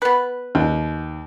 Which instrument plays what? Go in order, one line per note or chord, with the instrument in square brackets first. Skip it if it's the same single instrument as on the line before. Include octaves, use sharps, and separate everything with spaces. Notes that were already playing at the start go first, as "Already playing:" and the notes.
[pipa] B3 B4
[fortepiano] D#2